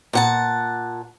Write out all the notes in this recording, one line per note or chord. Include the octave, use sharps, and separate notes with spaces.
A#2 F#5 A5